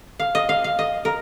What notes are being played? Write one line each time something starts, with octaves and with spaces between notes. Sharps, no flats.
F5
D#5
F5
F5
D#5
A#4